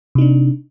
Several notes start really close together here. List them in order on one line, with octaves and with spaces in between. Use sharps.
C3 D#4 D4